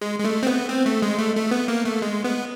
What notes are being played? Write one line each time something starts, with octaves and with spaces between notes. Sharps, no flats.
G#3
G#3
A3
C4
B3
C4
A3
G#3
A3
A3
B3
A#3
A3
G#3
B3